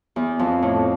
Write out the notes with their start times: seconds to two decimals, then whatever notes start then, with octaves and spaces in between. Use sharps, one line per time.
0.16 E2
0.39 F2
0.62 A2